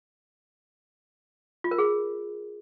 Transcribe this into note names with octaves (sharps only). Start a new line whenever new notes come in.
F4
A#4
G#4